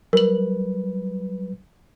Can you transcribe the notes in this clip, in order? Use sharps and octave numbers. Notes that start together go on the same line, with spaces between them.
F#3 G3 A#4 B4 F#7